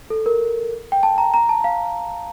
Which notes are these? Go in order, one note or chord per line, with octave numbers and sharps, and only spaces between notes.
A4
A#4
G5
A5
A#5
A#5
A5
F5